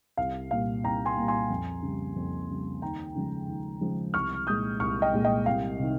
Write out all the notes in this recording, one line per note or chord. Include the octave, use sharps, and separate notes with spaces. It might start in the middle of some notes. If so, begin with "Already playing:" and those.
C2 F5
A#2 G3 F5
C2 G5 A#5
G#5 C6
A#2 G3
G#5 C6
F2
C#3 G3
F2
C#3 G3
D#2 G5 A#5
C#3 F3 G#3
D#2
C#3 F3 G#3
C2 C#6 F6
A#2 G#3 D#6 G6
C2 C#6 F6
D#5 G5
A#2 G#3
D#5 G5
C2 F5
C3 D#3